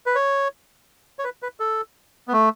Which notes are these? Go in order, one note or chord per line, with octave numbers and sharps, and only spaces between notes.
B4
C#5
C#5
B4
B4
A4
B3
A3